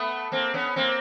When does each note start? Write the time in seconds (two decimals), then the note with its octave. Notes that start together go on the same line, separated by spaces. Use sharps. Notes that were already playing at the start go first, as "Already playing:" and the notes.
Already playing: A3 B3
0.32 A#3 C4
0.54 B3 C#4
0.76 A#3 C4